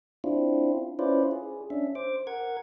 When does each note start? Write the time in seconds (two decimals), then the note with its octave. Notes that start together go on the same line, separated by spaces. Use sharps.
0.24 C4 D4 E4 F4
0.99 C#4 E4 F4 B4 C5 D5
1.31 G#4
1.70 C#4 D4 E5
1.95 C5 D6
2.27 A#4 F#5 G#6